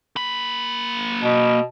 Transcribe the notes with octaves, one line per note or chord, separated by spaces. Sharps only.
A#3 B5
B2